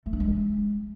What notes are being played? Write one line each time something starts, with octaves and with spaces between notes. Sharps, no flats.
A3
D4
G#3